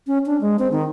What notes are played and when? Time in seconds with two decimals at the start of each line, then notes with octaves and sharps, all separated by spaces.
0.07 C#4
0.26 D4
0.41 G#3
0.59 C4
0.72 D#3